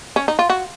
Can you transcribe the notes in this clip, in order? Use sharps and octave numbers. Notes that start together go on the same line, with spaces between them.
C#4
D#4
F4
F#4